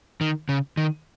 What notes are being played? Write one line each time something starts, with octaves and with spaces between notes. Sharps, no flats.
D#3
C#3
D#3